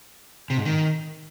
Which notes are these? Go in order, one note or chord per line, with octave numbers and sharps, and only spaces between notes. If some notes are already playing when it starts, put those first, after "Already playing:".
C3
G#2
D#3